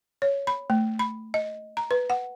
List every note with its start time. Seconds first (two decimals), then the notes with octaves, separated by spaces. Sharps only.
0.22 C#5
0.47 B5
0.70 A3
0.99 B5
1.34 D#5
1.77 A#5
1.91 B4
2.10 F#5